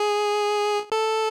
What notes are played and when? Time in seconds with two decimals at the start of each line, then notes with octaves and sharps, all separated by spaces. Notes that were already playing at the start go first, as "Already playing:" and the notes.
Already playing: G#4
0.92 A4